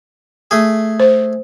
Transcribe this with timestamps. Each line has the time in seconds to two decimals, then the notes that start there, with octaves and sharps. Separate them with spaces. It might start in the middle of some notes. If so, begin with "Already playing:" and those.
0.51 A3 G#4
1.00 C5